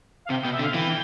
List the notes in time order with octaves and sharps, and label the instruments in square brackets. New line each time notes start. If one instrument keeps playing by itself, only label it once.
[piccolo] F5
[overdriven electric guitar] C3 [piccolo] G5
[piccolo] G5
[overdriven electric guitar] B2
[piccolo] E5
[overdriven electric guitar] D3
[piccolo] F5
[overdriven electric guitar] E3 [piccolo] G5